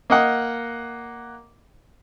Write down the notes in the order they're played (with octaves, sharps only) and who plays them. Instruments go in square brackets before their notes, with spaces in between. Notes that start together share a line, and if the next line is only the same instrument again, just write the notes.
[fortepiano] A#3 D#5 F#5